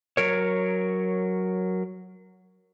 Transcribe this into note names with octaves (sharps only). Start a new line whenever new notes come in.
F#3 A#4 C#5